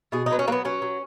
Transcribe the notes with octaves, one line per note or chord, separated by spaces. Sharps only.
B2 G#4
D#4
F#3 B3
C#4
F#3 A#3 B3
F#3 C#4
F#3